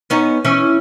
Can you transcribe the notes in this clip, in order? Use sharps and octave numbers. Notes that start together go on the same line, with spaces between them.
B3 C#4 D#4
E3 C#4 E4